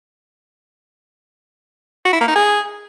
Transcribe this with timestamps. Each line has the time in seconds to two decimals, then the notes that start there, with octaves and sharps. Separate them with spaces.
2.05 F#4
2.13 E4
2.20 A#3
2.28 D#4
2.35 G#4